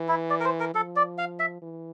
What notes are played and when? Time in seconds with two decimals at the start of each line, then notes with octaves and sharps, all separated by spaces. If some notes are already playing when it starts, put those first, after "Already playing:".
Already playing: E3
0.09 E4
0.30 D5
0.40 A#4
0.45 C5
0.60 A#4
0.74 F3 A4
0.96 D5
1.18 F5
1.39 E5
1.62 E3